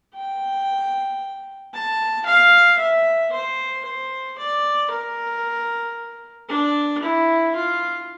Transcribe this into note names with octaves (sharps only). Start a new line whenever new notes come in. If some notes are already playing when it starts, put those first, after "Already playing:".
G5
A5
F5
E5
C5
C5
D5
A#4
D4
E4
F4